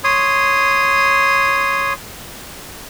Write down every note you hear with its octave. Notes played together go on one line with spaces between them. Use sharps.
C#5 C6 D#6